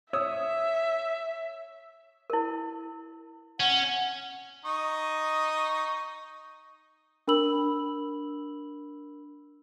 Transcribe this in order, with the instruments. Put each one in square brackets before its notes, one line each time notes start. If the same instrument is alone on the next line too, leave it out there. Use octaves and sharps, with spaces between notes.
[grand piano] C#5 D#6 E6 [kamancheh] E5
[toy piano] E4 A#4
[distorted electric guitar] C#4 [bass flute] F#5
[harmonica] D#4 C#6 D#6
[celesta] D4 A#4 B5 E6 F#7